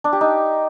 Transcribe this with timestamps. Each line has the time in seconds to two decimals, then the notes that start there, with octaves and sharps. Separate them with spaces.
0.04 D4
0.13 G4
0.21 D#4